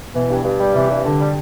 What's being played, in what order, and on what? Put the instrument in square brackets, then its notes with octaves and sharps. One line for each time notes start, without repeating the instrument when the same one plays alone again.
[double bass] B2 [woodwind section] E3
[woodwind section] G2
G2
G3
[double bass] C3 [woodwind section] E3
[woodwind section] G2
[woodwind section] G2 [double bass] D3
[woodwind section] G3